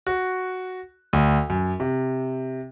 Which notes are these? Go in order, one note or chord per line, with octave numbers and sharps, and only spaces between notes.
F#4
D2
F#2
C3